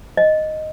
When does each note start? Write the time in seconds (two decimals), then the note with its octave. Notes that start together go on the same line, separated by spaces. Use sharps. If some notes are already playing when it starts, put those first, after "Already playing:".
0.17 D#5